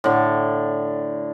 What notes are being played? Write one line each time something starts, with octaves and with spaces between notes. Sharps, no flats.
A2 D3